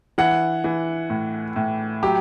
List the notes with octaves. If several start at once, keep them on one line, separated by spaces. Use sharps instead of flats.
E3 F#5
E3
A2
A2
F#3 G4